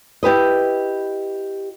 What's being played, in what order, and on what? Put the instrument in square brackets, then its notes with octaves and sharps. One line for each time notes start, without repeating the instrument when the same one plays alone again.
[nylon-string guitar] E4 G4 B4 D#5